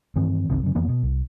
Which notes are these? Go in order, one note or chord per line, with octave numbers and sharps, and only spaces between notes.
G2 D#3 E3 C4
F#1 B1 C3 D#3
F#2 C#3
F2 E3 A#3 B3
B2
C2